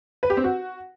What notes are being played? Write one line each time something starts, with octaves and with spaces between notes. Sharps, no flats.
B4
G4
C4
F#4